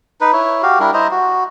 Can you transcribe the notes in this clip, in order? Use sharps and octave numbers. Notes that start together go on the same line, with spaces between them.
D#4 B4
E4 C#5
F#4 G4 F5
G3 D4 E4 A#4
E4 C5 D#5 A#5
F#4